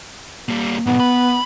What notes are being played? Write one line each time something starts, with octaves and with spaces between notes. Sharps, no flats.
G3 A#3
B1 G#2 B3
B5